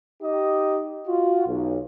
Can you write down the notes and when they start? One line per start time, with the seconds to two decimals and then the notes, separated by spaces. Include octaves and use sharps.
0.22 D#4 G4 D#5
1.07 F4 F#4
1.47 B1